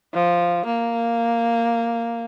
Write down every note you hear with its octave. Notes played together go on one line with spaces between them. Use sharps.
F3
A#3